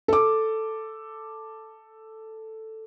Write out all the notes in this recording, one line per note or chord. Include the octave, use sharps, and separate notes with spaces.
A4 D6